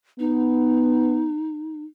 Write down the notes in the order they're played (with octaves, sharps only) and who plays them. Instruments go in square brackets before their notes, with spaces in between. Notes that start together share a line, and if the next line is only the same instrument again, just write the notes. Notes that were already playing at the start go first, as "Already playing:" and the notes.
[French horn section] B3 [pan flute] D#4